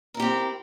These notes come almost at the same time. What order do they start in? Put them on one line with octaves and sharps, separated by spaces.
A#4 E4 G4 C4